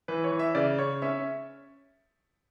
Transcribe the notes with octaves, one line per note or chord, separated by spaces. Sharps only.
E3 B4
C#5
E3
E5
C#3 D5
C#3 C#5
C#4 E5